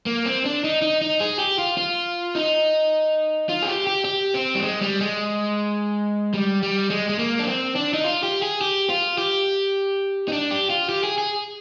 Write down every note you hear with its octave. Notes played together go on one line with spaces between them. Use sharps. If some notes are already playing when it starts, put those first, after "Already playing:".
A#3
C4
D4
D#4
D#4
D#4
G#4
G4
F4
F4
D#4
F4
G#4
G4
G4
G4
C4
G3
G#3
G3
G#3
G3
G3
G#3
G#3
A#3
D4
C4
D4
D#4
F4
G4
G#4
G4
F4
G4
D#4
D4
G4
F4
G4
G#4
G#4